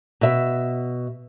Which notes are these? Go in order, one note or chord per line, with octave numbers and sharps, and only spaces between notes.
B2 E5